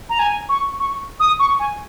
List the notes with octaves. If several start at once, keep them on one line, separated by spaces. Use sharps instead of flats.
A#5
G#5
C#6
C#6
D#6
C#6
G#5